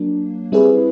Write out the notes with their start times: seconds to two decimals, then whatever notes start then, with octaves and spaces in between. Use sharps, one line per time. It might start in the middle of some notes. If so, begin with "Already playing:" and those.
Already playing: F#3 A#3 D4
0.52 G3 C4 E4 G#4 B4